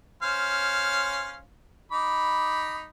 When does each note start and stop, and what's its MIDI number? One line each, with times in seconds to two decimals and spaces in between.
0.23 1.39 61
0.23 1.39 72
0.23 1.39 77
1.92 2.88 63
1.92 2.88 83
1.92 2.88 86